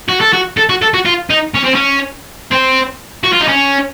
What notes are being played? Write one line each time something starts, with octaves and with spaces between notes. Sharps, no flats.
F#4
A4
F#4
A4
F#4
A4
F#4
F4
D#4
C#4
C4
C#4
C4
F#4
F4
D#4
C#4